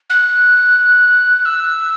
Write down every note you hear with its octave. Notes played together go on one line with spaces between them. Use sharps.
F#6
E6